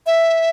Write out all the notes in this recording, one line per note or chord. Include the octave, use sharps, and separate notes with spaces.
E5